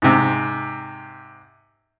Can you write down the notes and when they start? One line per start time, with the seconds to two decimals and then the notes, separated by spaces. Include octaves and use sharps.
0.02 G#2 C3